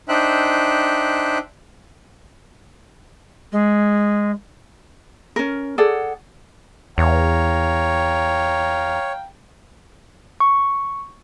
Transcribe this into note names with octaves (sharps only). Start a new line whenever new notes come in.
D4 D#4 C5 E5 G5 F#6
G#3
C#4 A#4
G#4 A4 D5 F#5
E2 C#5 F5 G5 A#5
C#6